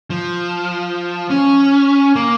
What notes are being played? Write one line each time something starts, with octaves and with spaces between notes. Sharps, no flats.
F3
C#4
A#3